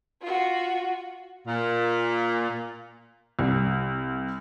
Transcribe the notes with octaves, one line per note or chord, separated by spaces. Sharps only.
F4 F#4
A#2
C2